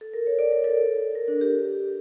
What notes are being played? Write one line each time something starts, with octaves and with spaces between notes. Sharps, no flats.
A4
A#4
C#5
D5
A#4
A4
A#4
D4
G4